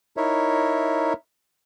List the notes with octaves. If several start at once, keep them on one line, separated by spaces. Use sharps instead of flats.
D#4 E4 A#4 C#5 E5